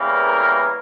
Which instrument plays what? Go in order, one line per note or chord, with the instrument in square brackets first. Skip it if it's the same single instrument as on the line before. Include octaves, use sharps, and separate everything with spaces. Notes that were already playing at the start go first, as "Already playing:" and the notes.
Already playing: [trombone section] E2 C#3 E3 G3 A#3
A#4